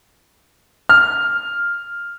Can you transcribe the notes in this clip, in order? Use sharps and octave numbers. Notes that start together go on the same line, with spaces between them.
F6